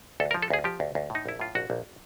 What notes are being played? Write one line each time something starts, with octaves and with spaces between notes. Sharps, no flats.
D2 A4
A#4
F3
A4
D2 G#4
F3 G4
D2
D2
A2
D#4
A#1 E4
A2 F4
A#1 F#4
A#1